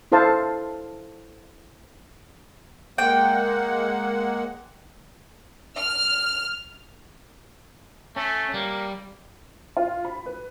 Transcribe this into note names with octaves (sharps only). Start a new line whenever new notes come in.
E4 A4 C5 F5 A5
G#3 A#3 F#5 G5
F6
A3 C#4
G3 A#3
F4
B5
B4